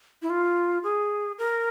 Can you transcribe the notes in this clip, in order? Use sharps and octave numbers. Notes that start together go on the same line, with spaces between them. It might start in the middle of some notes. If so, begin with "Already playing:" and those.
E4
F4
G#4
A#4